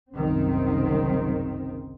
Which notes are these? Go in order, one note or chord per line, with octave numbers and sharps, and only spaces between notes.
F#1 C2 F#2 D#3 C4